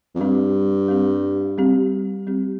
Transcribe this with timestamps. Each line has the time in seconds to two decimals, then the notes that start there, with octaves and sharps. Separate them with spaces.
0.15 F2
0.20 G2 G3 C4 G4
0.88 G3 C4 G4
1.58 G3 C4 G4
2.27 G3 C4 G4